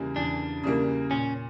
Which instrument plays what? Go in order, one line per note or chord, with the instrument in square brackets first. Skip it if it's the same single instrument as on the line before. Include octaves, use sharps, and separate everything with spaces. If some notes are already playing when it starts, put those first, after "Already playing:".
Already playing: [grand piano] E2 C#3 E3 G3 A#3
[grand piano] E2 [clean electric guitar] D4
[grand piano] C#3 E3 G3 A#3
[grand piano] A#2 [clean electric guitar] C#4